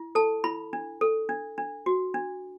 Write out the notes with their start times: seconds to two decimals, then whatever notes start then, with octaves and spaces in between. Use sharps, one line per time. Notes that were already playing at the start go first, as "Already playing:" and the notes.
Already playing: E4
0.15 A4 A5
0.44 E4 B5
0.73 D4
1.01 A4
1.29 D4
1.58 D4
1.86 F#4
2.14 D4